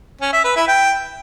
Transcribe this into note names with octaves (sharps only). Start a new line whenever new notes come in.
C#4
E5
B4
E4
G5